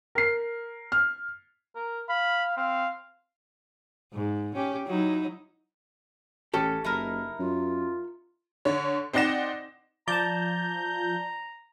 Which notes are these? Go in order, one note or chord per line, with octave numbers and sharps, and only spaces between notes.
A#4 C7
F6
A#4
F5 B5
C4 F5
G#2
C#4 G4
F#3 D#4 E4
A1 C#4 G4 A4
F#1 D#4 E4 A#4
F#2 F4
D3 C#5
C4 D#4 D5 F#5 A#6 E7
F3 D5 A5 A#5 G6